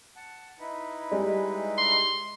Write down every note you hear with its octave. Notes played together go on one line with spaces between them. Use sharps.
F#5 A5
D#4 E4 B4
G3 G#3
C6